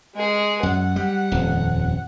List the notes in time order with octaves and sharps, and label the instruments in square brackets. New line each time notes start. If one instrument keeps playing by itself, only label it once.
[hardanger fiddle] G#3 G#4
[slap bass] F#2 [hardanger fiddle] F#5
[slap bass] G3
D#1 F2